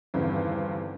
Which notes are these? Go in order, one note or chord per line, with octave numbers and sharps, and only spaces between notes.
E2 G2 D3 D#3 C4